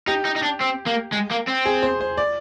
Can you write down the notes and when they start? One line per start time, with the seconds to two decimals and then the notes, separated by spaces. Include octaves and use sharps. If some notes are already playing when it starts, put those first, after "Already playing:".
0.07 D#4 G4
0.25 D#4
0.36 D#4
0.43 D4
0.61 C4
0.86 A#3
1.12 G#3
1.31 A#3
1.47 C4
1.66 G#4
1.83 C5
2.01 C5
2.17 D5